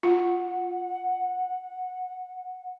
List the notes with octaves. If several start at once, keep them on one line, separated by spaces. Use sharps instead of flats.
F4 F#5